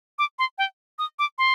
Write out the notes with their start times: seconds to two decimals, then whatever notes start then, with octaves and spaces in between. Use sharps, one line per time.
0.19 D6
0.39 C6
0.58 G5
0.99 D#6
1.19 D6
1.38 C6